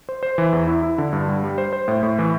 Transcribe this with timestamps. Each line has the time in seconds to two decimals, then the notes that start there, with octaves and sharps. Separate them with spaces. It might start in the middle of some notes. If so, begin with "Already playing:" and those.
0.09 C5
0.23 C5
0.38 E3
0.53 E2
0.68 E4
0.83 E4
0.98 D3
1.13 G2
1.28 G3
1.44 G3
1.58 C5
1.73 C5
1.88 A2
2.03 A2
2.19 E3